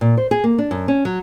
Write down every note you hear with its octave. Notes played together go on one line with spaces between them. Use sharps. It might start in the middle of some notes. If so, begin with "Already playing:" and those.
A#2
C5
G#4
A#3
D4
F#2
C#4
F#3